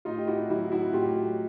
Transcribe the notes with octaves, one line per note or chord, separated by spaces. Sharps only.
A2 D#4 F4
G4
E4 F#4
F#3 E4 F#4
E4 F#4
A2 F4 G4